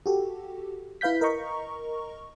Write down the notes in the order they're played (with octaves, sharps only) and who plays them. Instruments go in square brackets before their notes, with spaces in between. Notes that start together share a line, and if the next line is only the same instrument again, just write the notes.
[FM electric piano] F#4 G4 A4
E4 B4 F5 G6 B6
A#4 D#5 A#5 C#6